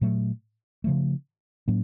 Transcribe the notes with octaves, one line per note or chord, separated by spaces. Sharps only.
A#2 F#3 A3
C#3 F3 A3
A2 F#3 A#3 C#4